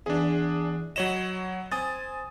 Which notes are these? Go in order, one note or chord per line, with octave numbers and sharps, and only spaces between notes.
E2 D4 G#4
F#3 C#5 D#5 B5 C6 E7
C4 G#5 D#6 A6